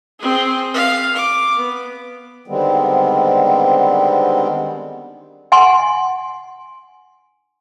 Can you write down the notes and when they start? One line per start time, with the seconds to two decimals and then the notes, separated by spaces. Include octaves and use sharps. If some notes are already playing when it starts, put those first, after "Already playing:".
0.19 C4 G#4
0.74 F5
1.15 D6
1.56 B3
2.47 D3 D#3 G3 G#3 B3 C4
5.52 F#5 G#5 C6